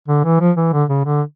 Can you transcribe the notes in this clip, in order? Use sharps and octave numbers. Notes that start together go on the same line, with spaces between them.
D3
E3
F3
E3
D3
C#3
D3